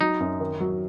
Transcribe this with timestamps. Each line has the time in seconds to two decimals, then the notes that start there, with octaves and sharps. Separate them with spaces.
0.01 F#3 D#4
0.20 F#2
0.40 D#3
0.60 F#3